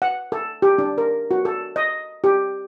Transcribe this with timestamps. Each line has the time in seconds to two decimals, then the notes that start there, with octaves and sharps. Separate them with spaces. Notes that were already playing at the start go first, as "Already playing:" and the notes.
0.02 F#5
0.32 A4
0.62 G4
0.78 D4
0.98 A#4
1.31 F#4
1.45 A4
1.76 D#5
2.24 G4